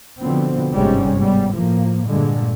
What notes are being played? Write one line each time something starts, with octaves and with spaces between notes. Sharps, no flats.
B2 D3 F3 B3 C4
G1 G#2 C3 G3 G#3 C#4
G#2 G3 B3
A2 F3 A#3
G2 A#2 D3 G#3